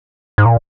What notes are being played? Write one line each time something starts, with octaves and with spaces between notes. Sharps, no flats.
G#2
A#2